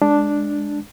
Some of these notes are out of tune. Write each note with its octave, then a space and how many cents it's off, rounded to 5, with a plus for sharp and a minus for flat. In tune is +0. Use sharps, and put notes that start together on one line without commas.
G#3 +0 D4 +0